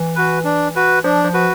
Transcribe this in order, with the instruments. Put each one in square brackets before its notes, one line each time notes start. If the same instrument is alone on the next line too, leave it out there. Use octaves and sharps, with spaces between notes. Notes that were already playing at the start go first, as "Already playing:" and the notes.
Already playing: [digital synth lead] E3
[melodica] F#4 B4
D4
F#4 B4
[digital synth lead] F3 [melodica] D4
[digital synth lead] F3
[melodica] F#4 B4